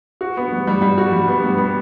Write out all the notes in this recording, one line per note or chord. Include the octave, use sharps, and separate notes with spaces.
F#4
B3
G3
G3
G3
F#4
G3
B3
G3
B3